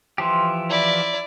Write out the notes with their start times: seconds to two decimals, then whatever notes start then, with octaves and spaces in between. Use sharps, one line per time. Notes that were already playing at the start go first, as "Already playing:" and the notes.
0.18 E3 F3 G4 A5 C6
0.69 E4 D5